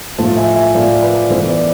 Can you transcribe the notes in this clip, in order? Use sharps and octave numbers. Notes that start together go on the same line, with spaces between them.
A2 F3 A3 F5 A5
E5 G#5
E5 G#5
A2 F3 A3 D5 F5
B4 D5
E3 B3 E4 A4 C5
B4 D5